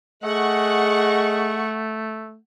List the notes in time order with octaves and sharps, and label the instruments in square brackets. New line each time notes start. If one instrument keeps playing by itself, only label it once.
[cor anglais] A3 [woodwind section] G#4 D#5 [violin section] F#5 C#6